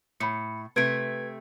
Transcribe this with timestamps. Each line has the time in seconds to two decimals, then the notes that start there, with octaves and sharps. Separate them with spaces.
0.20 A2 B5 C#7
0.76 C3 A3 B4 G#6 D7